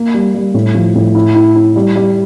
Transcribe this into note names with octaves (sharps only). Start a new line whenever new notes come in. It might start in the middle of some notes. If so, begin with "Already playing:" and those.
Already playing: A#3
G3
G3
A2
F3
A2
E4
E4
E4
G3
G3